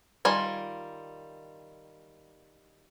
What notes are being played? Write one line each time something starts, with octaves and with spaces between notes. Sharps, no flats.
D#3 G3 F4 G#5